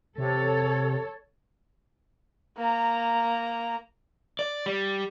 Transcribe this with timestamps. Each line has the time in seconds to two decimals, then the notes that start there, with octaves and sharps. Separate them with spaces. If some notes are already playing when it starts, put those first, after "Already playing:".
0.18 C3 A4 C#5
2.57 A#3 A#5
4.39 D5
4.66 G3